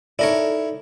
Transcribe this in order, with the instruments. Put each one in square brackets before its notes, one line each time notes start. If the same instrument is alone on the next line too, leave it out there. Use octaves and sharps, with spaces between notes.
[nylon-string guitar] D#4 A4 D5 [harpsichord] E4 A#4 C#5